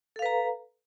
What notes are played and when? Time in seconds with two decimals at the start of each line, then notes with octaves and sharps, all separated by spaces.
0.16 A4
0.19 F5
0.22 B4
0.26 A#5